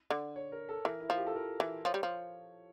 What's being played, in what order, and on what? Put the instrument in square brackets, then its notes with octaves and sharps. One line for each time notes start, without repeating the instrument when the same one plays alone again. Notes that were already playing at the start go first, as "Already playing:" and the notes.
[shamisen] D3
[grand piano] C#5
A#4
A4
[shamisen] E3 [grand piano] A#4
[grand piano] E4
[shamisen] F3 [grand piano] F4
[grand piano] G4
A4
A#4
[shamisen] E3
[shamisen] F3 [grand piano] C#5
[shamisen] G3
F3